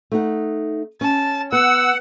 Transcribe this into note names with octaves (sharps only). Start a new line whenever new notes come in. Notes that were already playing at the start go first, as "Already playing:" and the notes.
A3 D#4 F#5
C#4 A5
B3 F#5 E6